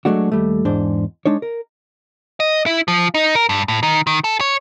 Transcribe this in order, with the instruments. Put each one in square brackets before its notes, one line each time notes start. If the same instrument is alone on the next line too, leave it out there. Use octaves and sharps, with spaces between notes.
[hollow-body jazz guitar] F#3 G#3 A3 D4 F#4
D#2 G3 A3
E2 G#2 D4 C5
G#3 D4 D#4 C#5
A#4
[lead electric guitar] D#5
E4
F3
D#4
A#4
G2
A2
D#3
D#3
A4
C#5